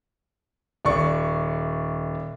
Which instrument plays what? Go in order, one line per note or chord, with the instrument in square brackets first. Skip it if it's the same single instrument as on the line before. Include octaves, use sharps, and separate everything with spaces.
[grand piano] D#1 D5 C#6